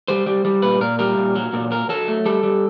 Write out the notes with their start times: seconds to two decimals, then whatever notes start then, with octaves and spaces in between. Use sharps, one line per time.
0.08 G3 C5
0.26 G3
0.45 G3
0.62 A#2 B4
0.80 A#2 A#4
0.99 G3 A#4
1.18 A#2
1.36 F#3
1.53 A#2
1.71 F#3 A#4
1.89 F#3 A4
2.08 A3
2.26 G3 A4
2.43 G3